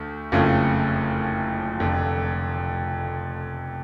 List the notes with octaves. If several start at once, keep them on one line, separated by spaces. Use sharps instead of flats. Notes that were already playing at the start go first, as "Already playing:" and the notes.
Already playing: D2 A3
F#1 F2 C#3 F3 A3
F1 F2 D3